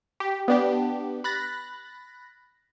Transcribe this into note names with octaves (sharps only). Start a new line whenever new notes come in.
G4
B3 D4 G4
B5 F#6 A6 A#6